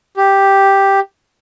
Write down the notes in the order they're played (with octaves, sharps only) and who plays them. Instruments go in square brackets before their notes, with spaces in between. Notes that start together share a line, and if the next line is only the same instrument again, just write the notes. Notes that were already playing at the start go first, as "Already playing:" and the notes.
[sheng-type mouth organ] G4